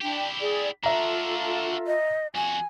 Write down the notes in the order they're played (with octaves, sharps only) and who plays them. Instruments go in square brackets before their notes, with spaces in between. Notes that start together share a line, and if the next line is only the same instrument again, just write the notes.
[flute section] D4 G5 [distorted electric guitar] E4 G4
[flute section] G#4 D5
[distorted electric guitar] D4 F#4 [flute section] F4 A4 [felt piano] E5 A#5
[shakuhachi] D#5
[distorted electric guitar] F2 F#4 [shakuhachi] G#5